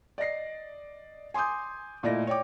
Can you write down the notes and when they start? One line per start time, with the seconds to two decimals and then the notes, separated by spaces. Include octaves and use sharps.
0.18 D5 D#5 A#6 C7
1.34 G#5 C6 D6 D#6 G6
2.03 A#2 A3 E4 D5 D#5 A#6
2.27 C#5 D5 G5 D6